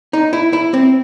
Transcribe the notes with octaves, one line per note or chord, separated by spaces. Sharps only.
D#4
E4
E4
C4